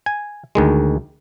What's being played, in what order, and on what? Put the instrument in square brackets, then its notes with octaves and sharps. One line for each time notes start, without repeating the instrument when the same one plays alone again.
[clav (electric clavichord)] G#5
D2 D#3 G#3